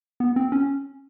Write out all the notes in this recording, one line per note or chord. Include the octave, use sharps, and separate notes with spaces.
B3
C4
C#4